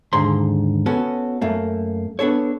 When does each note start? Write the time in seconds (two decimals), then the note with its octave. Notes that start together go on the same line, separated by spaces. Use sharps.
0.13 D#2 G#2 D3 A#5 C6
0.86 B3 C#4 F#4 A4
1.41 F#2 A3 A#3
2.19 B3 D4 A4 C#5